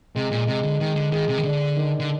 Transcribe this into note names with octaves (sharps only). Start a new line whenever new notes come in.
C3 G#3
A#2
C3 G#3
D3
D#3 G#3
D3
D#3 G#4
C3
D#3
D3 D4
D#3
D3